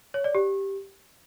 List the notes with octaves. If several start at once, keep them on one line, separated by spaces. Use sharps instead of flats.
C#5
D5
G4